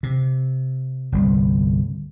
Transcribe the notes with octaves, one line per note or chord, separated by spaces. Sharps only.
C3
G1 C2